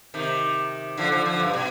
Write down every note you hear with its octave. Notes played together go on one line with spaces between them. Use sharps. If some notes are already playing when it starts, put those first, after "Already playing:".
C3 D#3
D3 F3
D3 F3
D3 F3
G2
B2